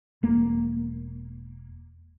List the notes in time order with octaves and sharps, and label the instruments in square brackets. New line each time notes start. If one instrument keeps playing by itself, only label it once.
[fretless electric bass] E1 A#3